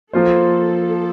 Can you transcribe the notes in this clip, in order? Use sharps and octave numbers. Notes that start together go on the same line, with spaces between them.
F3 A#3 F4 A4 C5